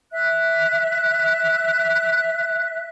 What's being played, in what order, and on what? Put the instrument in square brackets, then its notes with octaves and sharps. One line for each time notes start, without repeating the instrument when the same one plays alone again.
[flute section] E5 F#6